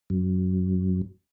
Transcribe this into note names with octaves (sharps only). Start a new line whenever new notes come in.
F#2